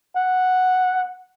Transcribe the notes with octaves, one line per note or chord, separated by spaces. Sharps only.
F#5